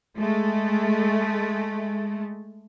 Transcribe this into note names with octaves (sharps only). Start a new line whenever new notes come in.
G#3 A3